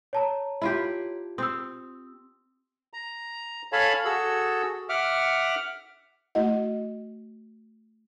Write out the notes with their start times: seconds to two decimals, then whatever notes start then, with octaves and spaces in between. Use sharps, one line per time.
0.13 C#5 A5 A#5
0.62 E4 F4 G4
1.38 C4 D#6 E6
2.93 A#5
3.72 A4 C#5 F5 G#5 A5 B5
4.05 F#4 G#4 A4 E6
4.89 E5 F#5 D6 F6
6.35 A3 E4 F#4 D#5 F#5